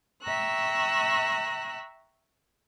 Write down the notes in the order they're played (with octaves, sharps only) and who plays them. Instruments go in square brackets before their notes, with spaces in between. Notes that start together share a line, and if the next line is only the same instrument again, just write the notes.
[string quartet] E5 G5 A#5 C#6 E6 F#6